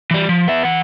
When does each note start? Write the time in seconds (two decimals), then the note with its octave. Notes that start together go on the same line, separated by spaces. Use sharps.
0.11 E3 G3
0.29 F3
0.48 B3 E5
0.65 E3 F#5